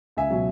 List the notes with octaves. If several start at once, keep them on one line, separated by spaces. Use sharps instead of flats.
C#2 E5 G#5
B2 F#3